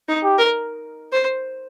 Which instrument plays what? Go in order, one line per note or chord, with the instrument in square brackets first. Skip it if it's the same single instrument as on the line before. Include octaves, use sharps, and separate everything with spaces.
[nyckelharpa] D#4
[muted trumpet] G4
[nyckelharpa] A#4
C5